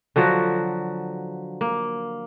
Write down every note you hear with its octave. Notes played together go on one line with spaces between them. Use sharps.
D3 F3 F#3 F#4
A#3